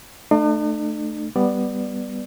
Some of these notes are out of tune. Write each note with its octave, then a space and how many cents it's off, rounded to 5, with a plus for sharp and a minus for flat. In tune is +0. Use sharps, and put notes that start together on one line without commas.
A3 +0 D4 +45
G3 +0 B3 +0 D5 +10